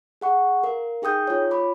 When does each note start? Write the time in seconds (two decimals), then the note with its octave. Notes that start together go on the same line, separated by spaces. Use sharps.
0.21 G#4 F#5 C#6
0.64 A#4 F5
1.02 D#4 G#4 G5 D#6 G6
1.27 F4 C#5
1.51 F4 B5 D6